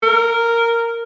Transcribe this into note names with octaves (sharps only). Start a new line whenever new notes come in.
A#4